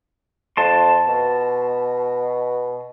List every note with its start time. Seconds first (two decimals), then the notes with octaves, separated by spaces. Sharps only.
0.57 F2 A5 C6
1.08 B2